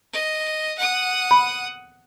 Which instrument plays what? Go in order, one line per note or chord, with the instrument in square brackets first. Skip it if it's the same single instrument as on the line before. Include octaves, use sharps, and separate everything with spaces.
[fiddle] D#5
F#5 D#6
[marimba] B5